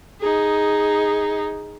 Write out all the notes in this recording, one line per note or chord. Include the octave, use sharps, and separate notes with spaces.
D#4 G#4